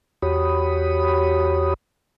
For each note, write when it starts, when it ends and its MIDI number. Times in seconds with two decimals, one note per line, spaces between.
0.22 1.74 40
0.22 1.74 66
0.22 1.74 67
0.22 1.74 73
0.22 1.74 83
0.22 1.74 87